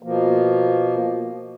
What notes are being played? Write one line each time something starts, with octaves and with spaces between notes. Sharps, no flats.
B2 F3 A#3